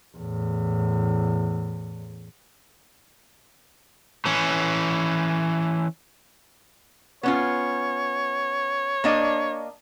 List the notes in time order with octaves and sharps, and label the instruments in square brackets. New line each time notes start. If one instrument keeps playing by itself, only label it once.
[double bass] E2 A2
[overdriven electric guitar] E3 C#4
[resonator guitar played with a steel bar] B3 C#4 F4 [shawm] C#5
[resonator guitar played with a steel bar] A#3 D4 D#5